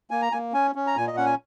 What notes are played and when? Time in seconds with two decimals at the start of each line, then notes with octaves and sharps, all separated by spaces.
0.11 A#3 G#5
0.22 A#5
0.32 A#3 G#5
0.53 C#4 G#5
0.75 C#4
0.87 A#5
0.96 A#2 G#5
1.07 D#5
1.17 C#4 F#5
1.26 G#5